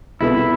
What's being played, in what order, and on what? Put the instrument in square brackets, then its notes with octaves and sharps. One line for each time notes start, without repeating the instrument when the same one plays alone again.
[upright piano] C2 B2 B3 F4 A4 [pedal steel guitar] E4